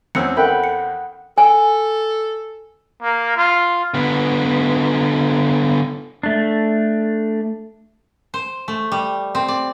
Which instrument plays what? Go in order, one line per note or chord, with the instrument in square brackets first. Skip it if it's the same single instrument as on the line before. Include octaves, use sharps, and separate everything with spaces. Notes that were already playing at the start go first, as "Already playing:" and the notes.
[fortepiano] E2 C4 C#4 [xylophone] E6 C#7
[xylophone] A4 A#4 E5 [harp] F#5 G5 B5
[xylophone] C#7
[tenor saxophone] A4 [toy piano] G#5
[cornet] A#3
F4
[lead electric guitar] D3 B3
[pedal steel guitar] A3 D4
[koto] C5
A3
G3
C4
D5